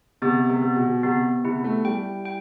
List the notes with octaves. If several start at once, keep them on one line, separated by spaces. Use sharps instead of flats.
C3 B3
C3
B3
B2
C3 B3
C3 E4
A3
G3 G5
G5